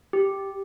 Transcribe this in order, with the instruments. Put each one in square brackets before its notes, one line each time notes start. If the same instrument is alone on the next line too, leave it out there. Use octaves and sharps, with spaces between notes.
[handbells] G4